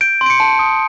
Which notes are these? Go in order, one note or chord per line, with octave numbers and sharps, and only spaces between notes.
G6 D7
C6
D7
C#7
A5
D#6